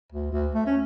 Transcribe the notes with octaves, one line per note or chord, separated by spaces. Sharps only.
D2
D2
A3
C#4